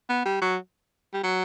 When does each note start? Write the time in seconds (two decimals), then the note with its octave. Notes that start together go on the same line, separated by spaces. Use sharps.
0.09 B3
0.25 G3
0.42 F#3
1.13 G3
1.23 F#3